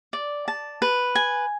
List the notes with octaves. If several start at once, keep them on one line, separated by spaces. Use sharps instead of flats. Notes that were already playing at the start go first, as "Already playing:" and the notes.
D5
A5
B4
G#5